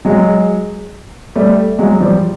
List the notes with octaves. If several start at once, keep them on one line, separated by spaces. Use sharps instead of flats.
F#3 G#3
G3 A3
F#3 G#3
F3 G3